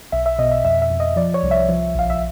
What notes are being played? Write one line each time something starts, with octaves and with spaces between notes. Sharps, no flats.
B1 E5
E5
B2 D#5
E5
F2 E5
E5
F2
D#5
F3 D5
C#5
C2
E5
F3
A#1 F5
E5